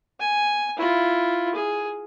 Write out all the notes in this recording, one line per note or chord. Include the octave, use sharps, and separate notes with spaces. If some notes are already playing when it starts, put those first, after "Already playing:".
G#5
E4 F4
G#4